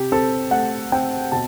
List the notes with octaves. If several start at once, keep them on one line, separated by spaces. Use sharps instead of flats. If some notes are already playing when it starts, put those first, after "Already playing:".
Already playing: C3 G4
C4 A4
A3 F#5
C4 G5
B2 A5